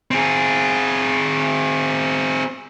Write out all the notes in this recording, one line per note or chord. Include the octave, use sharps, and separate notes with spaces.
C4 G#4